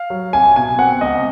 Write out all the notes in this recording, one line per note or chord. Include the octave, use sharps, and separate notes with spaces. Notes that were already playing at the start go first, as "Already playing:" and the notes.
Already playing: F5
F#3
C2 G#5
B2 G#5
C4 F#5
C#2 D#5